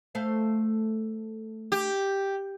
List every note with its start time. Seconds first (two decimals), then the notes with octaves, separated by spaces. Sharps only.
0.15 A3 C5 F5
1.72 G4